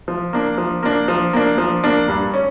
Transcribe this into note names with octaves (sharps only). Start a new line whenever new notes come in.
F3
A#3 D4
F3
A#3 D4
F3
A#3 D4
F3
A#3 D4
G2
C#4